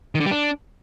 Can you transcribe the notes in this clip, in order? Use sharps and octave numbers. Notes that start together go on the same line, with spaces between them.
D#3
D3
G3
D4